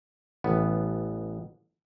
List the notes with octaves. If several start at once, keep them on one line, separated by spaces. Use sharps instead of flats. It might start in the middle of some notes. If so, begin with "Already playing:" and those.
A1 B3